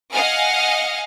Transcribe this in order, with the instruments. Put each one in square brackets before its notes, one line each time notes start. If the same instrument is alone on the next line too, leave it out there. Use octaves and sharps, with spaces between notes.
[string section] D#5 F5 F#5 G#5 F6